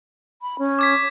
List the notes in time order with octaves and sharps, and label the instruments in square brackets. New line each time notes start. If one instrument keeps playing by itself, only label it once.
[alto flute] B5
C#4
[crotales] D6 G#6 B6